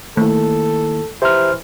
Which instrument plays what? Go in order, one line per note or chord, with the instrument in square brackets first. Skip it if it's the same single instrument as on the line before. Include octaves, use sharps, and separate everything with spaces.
[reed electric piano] D#3 A#3 E4 [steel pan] A3 [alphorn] A4
[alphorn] E3 [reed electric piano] G4 E5 A#5 [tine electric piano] C5 C6 F6